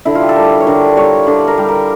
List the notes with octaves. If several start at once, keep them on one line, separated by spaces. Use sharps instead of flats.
D3 E4
F4
G4
A4
G3 A#4
C#5
D3 A#4
G3 C#5
D3 D5
A#4
G3
A#4